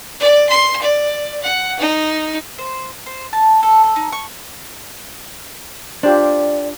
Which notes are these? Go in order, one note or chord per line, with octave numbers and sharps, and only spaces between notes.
D5
C6
D5
F#5
D#4
C5
C5
A5
A4
A4
D#4
C#6
D4 F4 G4 C5 D5